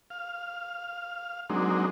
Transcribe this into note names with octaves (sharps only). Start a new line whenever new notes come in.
F5
F#3 G#3 A#3 C4 D4 D#4